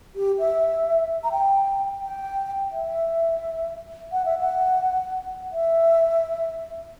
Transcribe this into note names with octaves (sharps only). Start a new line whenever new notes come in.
G4
E5
A#5
G5
G5
E5
F#5
E5
F#5
E5